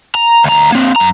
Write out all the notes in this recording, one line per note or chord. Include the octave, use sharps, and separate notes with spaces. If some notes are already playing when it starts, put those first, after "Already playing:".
A#5
D2 A#5
A#3 C4
F#2 A#5